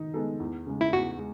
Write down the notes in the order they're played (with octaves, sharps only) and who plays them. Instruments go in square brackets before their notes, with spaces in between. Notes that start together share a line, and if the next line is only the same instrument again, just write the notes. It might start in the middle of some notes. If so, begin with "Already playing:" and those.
Already playing: [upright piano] D#3 D#4
G#3 B3 D#4 A4
E2
C#3 G#3
[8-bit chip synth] E4
[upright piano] E2 [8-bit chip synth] F#4
[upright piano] G#3